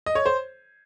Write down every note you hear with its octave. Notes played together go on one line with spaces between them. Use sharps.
D#5
C#5
C5